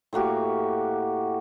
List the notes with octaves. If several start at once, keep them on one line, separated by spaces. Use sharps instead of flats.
A2 A#3 F#4 G4